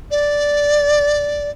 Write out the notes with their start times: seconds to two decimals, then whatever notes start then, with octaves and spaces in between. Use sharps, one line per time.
0.11 D5